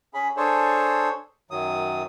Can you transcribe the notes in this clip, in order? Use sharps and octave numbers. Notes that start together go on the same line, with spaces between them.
C#4 G#4 B5
D4 G#4 A4 C5 C#5
F#2 D#3 F#3 D#6